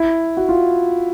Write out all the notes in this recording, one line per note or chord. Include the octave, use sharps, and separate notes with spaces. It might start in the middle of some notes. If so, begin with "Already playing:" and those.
Already playing: E4
F#4
F4